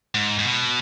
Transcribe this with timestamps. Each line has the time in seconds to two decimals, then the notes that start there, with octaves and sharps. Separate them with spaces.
0.15 G#2
0.39 G#2
0.45 B2